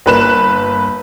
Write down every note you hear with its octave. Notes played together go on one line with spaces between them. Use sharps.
G1 A#3 B4 F#6 E7